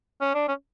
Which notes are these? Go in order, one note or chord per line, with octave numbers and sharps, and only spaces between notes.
C#4
D4
C#4